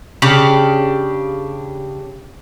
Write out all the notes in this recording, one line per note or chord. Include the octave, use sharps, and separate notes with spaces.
C#3 D4 G4